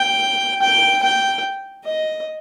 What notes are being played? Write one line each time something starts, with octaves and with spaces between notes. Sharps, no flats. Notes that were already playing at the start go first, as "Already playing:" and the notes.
Already playing: G5
G5
G5
D#5